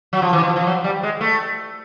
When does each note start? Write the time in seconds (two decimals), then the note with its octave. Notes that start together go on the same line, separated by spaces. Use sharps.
0.13 F#3
0.22 F3
0.33 E3
0.43 F3
0.56 F3
0.67 F#3
0.84 G3
1.03 G#3
1.21 A3